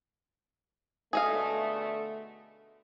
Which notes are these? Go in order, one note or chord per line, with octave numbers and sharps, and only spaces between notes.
B2 D3 A3 G#4 D#5 F5